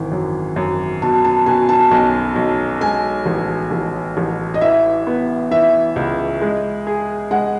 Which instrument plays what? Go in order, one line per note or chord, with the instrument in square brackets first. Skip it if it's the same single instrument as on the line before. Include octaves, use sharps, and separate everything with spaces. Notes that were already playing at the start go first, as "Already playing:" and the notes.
Already playing: [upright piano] G#1 E3
F#2
F#2
[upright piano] B2 [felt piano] A5
[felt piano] A5
[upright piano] B2 [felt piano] G#5
[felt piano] A5
[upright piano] B1 [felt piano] G#5
[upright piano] B1
[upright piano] G#3 [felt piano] G#5
[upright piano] A1
A1
A1
[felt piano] D#5
[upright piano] E3 [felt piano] E5
[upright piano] B3
[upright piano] E3 [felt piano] E5
[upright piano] C#2
G#3
G#4
[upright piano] G#3 [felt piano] F#5